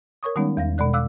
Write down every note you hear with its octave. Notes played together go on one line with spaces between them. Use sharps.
A#4 C#5 C#6 D#6
D#3 G3 G#3 B3 C#4 D#4
E2 F5 A#6
B2 G#3 D5 F#6
F5 D6 E6 F#6